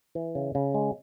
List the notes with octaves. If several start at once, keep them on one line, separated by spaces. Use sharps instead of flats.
E3
C#3
C#3
G#3